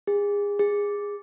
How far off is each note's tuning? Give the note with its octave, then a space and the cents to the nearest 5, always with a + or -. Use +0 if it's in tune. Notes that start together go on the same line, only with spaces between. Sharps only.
G#4 -30
G#4 -20